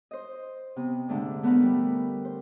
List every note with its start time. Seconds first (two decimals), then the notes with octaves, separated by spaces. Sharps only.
0.11 C5 D#5
0.76 C3 B3
1.08 G#2 D3 A3 D4
1.43 A3 B3 D4 A#4 B4
1.63 G3
2.25 C5